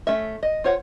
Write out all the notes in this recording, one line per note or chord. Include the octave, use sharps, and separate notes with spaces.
A3 C#4 E5
D#5
F4 C5 C#5 F#5